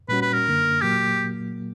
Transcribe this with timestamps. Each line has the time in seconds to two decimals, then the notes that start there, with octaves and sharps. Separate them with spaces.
0.09 A#2 G3 C#4 F#4 B4
0.22 B4
0.33 A#4
0.46 F#2 D3 A#3
0.82 A#2 F#3 A#3 G4